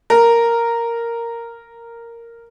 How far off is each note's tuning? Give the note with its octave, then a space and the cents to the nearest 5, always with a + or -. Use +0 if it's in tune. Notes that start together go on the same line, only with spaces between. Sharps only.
A#4 -5